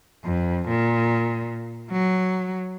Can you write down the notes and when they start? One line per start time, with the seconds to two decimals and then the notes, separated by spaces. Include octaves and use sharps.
0.24 F2
0.68 A#2
1.91 F#3